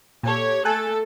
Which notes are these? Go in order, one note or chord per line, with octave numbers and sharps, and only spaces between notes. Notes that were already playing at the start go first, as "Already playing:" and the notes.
A#2 G4 A4 C#5
A3 A4 G#5 A5 F#6